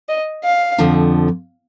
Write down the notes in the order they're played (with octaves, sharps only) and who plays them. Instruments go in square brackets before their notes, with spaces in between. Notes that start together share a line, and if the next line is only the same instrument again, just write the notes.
[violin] D#5
F5
[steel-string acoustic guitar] F2 D3 F3